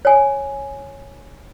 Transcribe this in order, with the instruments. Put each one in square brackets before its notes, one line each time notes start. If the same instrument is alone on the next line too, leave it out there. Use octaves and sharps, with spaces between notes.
[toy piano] C#5 G#5